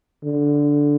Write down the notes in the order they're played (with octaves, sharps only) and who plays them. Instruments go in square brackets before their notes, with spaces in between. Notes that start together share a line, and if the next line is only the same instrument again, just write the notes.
[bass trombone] D3